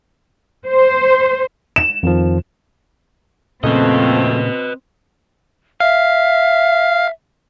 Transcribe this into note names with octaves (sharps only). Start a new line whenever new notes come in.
C5
E7
F2 D#3 F3
F2 A#2 C#3 A3 C4 B4 D#5
E5 F5